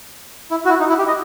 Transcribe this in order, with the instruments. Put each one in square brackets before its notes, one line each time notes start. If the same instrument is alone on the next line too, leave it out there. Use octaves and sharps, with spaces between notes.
[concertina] E4
F#4
E4
D#4
E4
G4
D#5